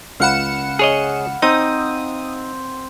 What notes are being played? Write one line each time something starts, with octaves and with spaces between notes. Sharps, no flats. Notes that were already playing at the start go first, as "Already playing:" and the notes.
C#2 F5 F#5 B5 C#7 E7
G#4 C#5 D#5
C4 D#4 D#6